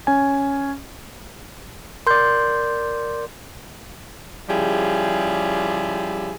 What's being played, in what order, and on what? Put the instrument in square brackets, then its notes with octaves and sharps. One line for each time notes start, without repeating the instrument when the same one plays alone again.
[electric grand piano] C#4 G#5
[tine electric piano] A#4 D5 [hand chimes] C6 G6
[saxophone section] C#3 F3 G3 E4 G4 G#4